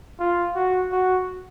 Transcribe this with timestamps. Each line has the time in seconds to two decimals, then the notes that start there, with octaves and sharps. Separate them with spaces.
0.20 F4
0.56 F#4
0.92 F#4